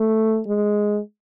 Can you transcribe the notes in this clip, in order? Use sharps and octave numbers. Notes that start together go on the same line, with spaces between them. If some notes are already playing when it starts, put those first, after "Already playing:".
Already playing: A3
G#3